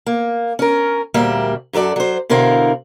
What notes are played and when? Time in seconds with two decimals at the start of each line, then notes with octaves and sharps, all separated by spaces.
0.06 A#3
0.59 C#4 A#4
1.14 D2 A#2 G3 A#3 E5
1.73 F#2 F#3 A4 D5
1.96 F#3 C5
2.30 B2 D3 E4 A#4 C5 F5